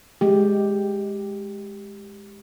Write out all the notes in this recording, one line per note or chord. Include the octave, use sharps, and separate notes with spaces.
G#3 G4